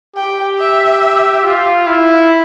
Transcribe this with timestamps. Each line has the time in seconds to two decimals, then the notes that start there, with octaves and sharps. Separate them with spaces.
0.16 G4 G5
0.59 E5
1.44 F4
1.87 E4